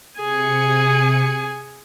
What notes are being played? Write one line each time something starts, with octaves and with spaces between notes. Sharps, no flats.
C3 G#4 G#5 C#7